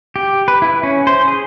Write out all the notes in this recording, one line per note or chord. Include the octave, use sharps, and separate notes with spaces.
G4
B4
E4
C#4
C5
G#4